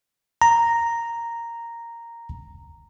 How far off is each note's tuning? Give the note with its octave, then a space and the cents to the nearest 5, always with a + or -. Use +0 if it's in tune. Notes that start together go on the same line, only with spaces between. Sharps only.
A#5 -5